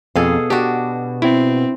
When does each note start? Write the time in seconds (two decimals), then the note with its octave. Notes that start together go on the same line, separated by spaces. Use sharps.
0.16 F2 B2 G#4 A4 F5
0.50 D4 F#4 G4
1.22 C4 E4